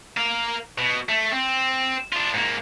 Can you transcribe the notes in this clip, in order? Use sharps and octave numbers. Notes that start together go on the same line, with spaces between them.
A#4 F5
B2
A3
C4
D4 F4
G#2 A#3